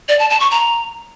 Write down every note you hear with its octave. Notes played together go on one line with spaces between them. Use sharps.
D5
A5
A5
C#6
A#5